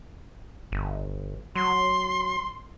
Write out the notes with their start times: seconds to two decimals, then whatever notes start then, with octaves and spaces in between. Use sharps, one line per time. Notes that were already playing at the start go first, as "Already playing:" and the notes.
0.72 G1
1.55 F#3 C6